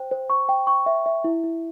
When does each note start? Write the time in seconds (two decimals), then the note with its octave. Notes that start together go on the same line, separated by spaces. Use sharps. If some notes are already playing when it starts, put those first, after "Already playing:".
Already playing: C5 G5
0.11 C5
0.30 C#6
0.49 G5
0.67 C#6
0.86 E5
1.06 E5
1.24 E4
1.44 E4